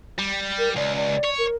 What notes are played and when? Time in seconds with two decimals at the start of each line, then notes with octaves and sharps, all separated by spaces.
0.19 G3
0.58 A#4
0.76 C#2 D5
0.96 D5
1.24 C#5
1.38 A#4